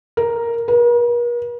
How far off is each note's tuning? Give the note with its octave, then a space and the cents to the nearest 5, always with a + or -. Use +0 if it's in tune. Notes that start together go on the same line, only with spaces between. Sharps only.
A#4 +5
A#4 +45